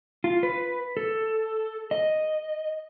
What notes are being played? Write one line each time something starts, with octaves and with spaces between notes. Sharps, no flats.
F4
B4
A4
D#5